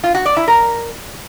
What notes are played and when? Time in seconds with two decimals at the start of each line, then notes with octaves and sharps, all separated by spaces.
0.04 F4
0.15 F#4
0.26 D5
0.37 E4
0.48 A#4